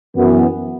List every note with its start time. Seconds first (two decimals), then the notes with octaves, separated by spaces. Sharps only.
0.15 F#2 E3 B3